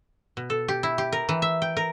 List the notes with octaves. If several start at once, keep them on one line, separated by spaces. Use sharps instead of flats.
B2
A4
G4
E4
G4
A#4
E3
E5
G5
A#4